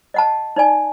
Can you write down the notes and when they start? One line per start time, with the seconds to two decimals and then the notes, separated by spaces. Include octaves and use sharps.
0.14 D#5 F#5 A5
0.56 D#4 D5 G#5